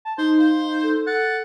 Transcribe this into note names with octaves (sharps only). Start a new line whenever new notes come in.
A5
D#4 C5
C5 F5
A4
F#5 A6